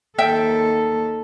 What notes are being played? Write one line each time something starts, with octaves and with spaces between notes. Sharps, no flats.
D#2 A4 E5 G5